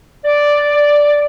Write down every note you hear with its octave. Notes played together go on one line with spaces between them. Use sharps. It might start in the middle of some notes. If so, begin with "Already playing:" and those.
D5